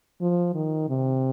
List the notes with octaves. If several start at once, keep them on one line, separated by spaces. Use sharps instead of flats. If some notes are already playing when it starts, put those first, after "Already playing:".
F3
D#3
C3